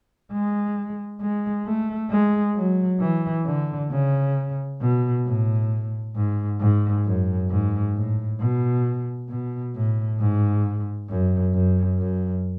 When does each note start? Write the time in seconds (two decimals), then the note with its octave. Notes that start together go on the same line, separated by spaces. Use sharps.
0.32 G#3
1.21 G#3
1.66 A3
2.10 G#3
2.56 F#3
3.00 E3
3.46 D3
3.91 C#3
4.81 B2
5.26 A2
6.16 G#2
6.60 G#2
7.05 F#2
7.50 G#2
7.95 A2
8.40 B2
9.29 B2
9.75 A2
10.20 G#2
11.10 F#2
11.54 F#2
11.99 F#2